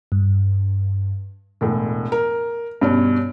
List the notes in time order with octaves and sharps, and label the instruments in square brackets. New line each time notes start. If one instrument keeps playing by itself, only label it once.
[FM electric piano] G2
[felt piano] E1 A2
A#4
G2 B2 C#4